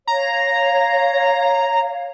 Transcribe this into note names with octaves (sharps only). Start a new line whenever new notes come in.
C#5 F5 A#5